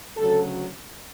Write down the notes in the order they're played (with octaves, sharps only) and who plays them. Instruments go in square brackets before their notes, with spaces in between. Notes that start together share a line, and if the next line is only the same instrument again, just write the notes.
[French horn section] D2 C#3 F#3 A4